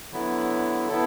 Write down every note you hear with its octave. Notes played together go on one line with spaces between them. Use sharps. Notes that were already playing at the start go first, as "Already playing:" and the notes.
D3 F#3 B3 E4
B3 E4 A4